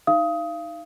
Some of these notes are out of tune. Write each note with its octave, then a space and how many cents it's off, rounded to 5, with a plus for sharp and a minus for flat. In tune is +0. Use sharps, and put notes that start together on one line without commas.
D#4 +0 F5 -30 D#6 +20